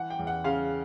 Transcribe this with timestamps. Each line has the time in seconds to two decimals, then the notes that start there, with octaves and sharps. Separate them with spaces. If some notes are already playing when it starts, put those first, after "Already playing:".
Already playing: E3 F#5
0.10 G5
0.19 E2
0.27 F#5
0.44 C#3 F5